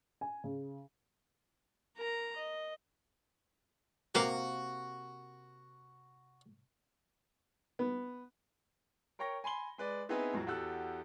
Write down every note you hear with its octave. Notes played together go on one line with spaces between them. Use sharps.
G#5
C#3
A#4 A#5
D#5
C3 A#3 F#4 F5
B3
A#4 C#5 G5 C#6 A#6
G#5 B5 C6 G7
G#3 B4 D5
B3 C4 D#4 E4 G#4 B4
F2 A2 F#3
E2 F#4 G4 A4 E6 F#6